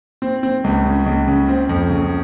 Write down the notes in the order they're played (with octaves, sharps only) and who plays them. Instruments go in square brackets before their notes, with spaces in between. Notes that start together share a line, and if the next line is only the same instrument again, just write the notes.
[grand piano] C4
C4
C#2
C#3
C#2
C#3
C4
F2
C#3